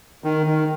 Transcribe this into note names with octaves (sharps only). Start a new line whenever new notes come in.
D#3
D#3